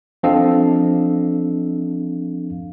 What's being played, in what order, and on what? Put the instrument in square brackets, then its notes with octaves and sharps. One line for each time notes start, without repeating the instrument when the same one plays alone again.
[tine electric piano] F3 C4 D4 A4 D#5 F5